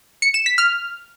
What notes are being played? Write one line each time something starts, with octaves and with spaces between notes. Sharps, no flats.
C#7
E7
B6
F6